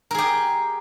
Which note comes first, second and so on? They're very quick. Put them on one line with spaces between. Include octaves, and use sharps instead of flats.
A#4 G#4 G4